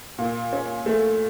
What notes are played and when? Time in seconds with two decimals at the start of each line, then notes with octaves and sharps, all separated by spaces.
0.18 A#2
0.53 C#4
0.86 A3